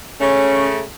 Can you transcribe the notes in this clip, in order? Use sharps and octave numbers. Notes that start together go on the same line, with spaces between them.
C#3 A3 C#4